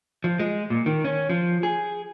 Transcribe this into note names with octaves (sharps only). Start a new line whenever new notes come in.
F3
G#3
A#2
D#3
C#4
F3
G#4